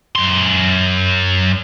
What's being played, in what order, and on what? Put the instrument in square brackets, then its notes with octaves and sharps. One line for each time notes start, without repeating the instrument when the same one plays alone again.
[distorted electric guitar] F#2 C6